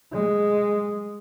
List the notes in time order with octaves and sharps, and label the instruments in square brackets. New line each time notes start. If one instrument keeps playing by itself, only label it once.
[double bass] G#3